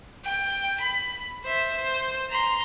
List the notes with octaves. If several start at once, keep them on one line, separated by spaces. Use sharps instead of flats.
G5
B5
C5 E5
C5
A#5 C6